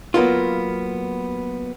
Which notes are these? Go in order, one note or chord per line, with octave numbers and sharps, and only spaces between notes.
F#3 A#3 B3 F4